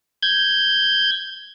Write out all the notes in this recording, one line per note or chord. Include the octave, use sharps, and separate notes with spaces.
G6 G#6